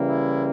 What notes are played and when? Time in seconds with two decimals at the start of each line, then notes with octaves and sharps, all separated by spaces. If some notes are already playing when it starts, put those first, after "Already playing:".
Already playing: C#3 E3 G3 A#3
0.09 E4